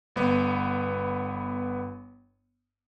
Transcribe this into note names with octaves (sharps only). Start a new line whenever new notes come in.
G1 B3